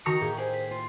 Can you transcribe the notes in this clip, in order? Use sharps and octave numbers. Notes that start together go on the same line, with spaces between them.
D#3 F#4 A#5 C#6 D#6
A2 A#3 G4 G#4
G4 G#4 C5
B6
F4